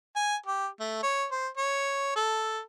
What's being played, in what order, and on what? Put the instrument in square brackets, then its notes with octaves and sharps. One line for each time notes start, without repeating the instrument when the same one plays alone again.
[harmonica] G#5
G4
A3
C#5
C5
C#5
A4